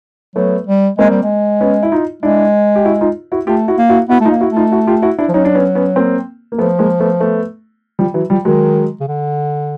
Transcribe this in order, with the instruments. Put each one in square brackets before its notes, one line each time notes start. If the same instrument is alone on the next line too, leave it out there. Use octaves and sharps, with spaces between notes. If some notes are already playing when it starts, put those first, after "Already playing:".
[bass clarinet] F#3 [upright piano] A3 B3
[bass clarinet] G3
[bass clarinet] G#3 [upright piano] A#3 C4
[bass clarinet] G3
G#3
[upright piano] B3 C#4
E4
D#4 F4
[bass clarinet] G#3 [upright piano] D4 E4
[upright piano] G4
E4 F#4
D#4 F4
E4 F#4
[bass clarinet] A3 [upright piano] F4 G4
[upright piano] E4 F#4
[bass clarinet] A#3
[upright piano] E4 F#4
[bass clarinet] B3 [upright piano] E4 F#4
[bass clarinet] A3 [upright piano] D#4 F4
[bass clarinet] A#3
[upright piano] E4 F#4
[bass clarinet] A3
[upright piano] D#4 F4
E4 F#4
F4 G4
E4 F#4
D4 E4
[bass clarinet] F3
[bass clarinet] F#3 [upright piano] C#4 D#4
[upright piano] D4
B3 C#4
B3 C#4
A#3 C4
A#3
[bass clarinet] F3 [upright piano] A3 B3
[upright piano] G#3 A#3
A3 B3
A3 B3
F3 G3
E3 F#3
F3 G3
[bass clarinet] D#3 [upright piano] F#3 G#3
[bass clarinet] C#3
D3